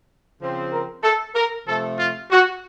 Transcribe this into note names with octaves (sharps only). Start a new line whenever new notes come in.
C#3 F3 C4
A#4
A4
A#4
C3 F3 A3 A4
F4
F#4